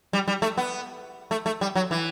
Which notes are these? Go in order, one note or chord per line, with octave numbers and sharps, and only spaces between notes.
G3
G3
A3
B3
A3
A3
G3
F#3
E3